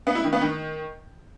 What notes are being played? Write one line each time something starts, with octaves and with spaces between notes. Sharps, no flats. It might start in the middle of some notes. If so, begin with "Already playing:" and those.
B3
E4
D#3
B3
D#3